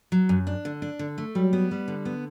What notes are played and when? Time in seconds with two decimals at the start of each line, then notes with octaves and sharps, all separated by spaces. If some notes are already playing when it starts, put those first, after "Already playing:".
0.12 F#3
0.29 F#2
0.47 D4
0.65 D3
0.82 D4
0.99 D3
1.18 A3
1.35 F#3 G3
1.53 B3
1.71 G3
1.88 D3
2.05 B3